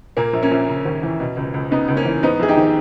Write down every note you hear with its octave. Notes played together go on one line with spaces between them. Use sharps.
A#2 A#3
A#1
A#3 C#4
A#1
C#3
D#2
E3
B2
C#2
C#2
C#3 B3 D#4
C#2
A#3 C#4
E3
G#2 B3 D#4
A#1 G#4
D#4 G4
D#3